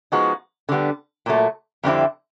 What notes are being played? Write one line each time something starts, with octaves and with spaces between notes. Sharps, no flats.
F3 G#3 B3 D#4 F#4
D3 G3 B3
A#2 F#3 A3
F2 D3 G3 C4 E4